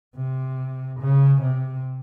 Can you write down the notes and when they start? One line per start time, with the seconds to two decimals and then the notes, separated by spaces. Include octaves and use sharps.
0.15 C3
1.00 C#3
1.41 C3